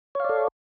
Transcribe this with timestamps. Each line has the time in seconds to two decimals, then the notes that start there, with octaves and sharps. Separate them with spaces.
0.15 C#5
0.20 F5
0.25 D5
0.29 A4